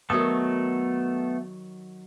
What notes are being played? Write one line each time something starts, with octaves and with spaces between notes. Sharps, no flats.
D#3 F#3 A3 B3 A4 A#4 D#6